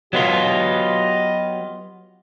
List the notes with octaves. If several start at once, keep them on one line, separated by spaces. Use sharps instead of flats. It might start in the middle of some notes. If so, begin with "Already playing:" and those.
F#3 B3 F4 G4 D#5